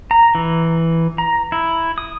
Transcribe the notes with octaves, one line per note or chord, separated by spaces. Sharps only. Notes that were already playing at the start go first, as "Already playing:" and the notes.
A#5
E3
A#5
E4
D#6